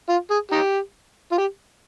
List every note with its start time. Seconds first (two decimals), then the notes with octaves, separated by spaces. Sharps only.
0.09 F4
0.31 G#4
0.52 D#4 G4
1.32 F4
1.38 G4